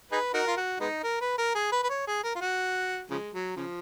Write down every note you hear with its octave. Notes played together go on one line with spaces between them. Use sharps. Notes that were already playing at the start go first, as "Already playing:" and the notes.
D#4 G#4 B4
D#4 F#4 A#4
F4
F#4
G#3 B3 D#4
A#4
B4
A#4
G#4
B4
B4
C#5
G#4
A#4
F4
F#4
C#3 F3 G#3
F#3
C#3 F3